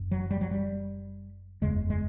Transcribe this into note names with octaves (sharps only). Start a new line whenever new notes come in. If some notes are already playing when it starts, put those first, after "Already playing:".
Already playing: F#1 F#2
F#3
G3
F#3
G3
F#1 E2 C#3 G#3
G#3